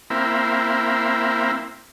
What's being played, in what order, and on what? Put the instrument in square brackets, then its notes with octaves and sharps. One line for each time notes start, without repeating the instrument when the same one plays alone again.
[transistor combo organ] A#3 C4 E4